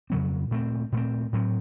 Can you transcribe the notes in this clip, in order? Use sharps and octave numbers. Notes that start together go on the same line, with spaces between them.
F2 C#3 F#3 C4
A#2 A3 C4
A#2 A3 C4
A2 F#3 C4